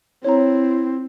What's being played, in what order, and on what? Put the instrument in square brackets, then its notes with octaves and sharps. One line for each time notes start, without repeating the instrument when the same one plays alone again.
[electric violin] C4 [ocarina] E4 [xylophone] C#5 A#5